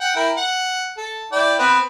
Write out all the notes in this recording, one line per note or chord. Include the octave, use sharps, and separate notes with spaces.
F#5 G5
E4 A#4 G5
F#5
A4
E4 D5 G5
B3 C4 B4